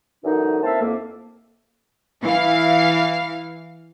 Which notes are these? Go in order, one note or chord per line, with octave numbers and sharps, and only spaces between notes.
F#2 D3 E3 D#4
A#3 C4 E4 E5 F5 A5
F2 A#3
E3 F5